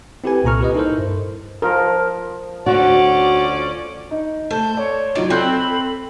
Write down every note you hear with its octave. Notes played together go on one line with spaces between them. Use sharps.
C4 E4 G4 A4 B4 G#5
C2 A#2 A4 A#5 C#6 F6
G4 B4 D#5
D#4 E4 A4 A#4 C5
G2
F3 A#4
D2 C#4 F#4 D5
D#4
A3 C5 A5
C#5 D5
F#3 D#4 F4 D5
C4 A4 B5 C6 F#6 G6